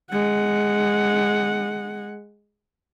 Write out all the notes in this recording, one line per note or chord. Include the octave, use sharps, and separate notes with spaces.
G#3 F#5